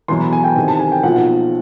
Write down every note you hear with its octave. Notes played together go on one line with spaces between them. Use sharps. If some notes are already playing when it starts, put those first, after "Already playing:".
E2 B2 F#3 C6
B5
G#5
G5
E2 C3 D#3 G#5
A5
G#5
G5
B1 A#2 F3 F#5